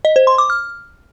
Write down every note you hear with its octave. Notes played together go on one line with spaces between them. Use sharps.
D#5
C5
C6
D6
F6